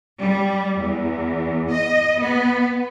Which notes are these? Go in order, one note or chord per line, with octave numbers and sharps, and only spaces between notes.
G3
E2
D#5
B3